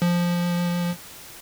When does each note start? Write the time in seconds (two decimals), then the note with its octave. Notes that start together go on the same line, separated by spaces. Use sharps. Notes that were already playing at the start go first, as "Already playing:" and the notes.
0.02 F3